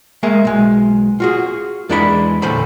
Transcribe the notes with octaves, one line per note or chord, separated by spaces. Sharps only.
G#3 A#3 G#4 E5
B1 G#3
F4 F#4 G#4
E2 G#3 D4 E4 G4 B5
E2 A#2 D3 C5 A5 B5